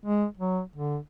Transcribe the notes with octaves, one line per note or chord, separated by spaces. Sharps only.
G#3
F#3
D3